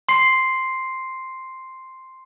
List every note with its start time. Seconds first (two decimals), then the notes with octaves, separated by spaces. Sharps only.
0.09 C6 C7